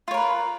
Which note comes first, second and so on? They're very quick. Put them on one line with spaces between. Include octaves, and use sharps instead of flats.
F4 C#5 A#4 B4